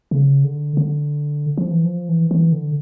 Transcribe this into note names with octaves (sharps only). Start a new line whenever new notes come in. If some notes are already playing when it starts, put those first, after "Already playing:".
C#3
D3
D3
F3
E3
F3
E3
E3
D3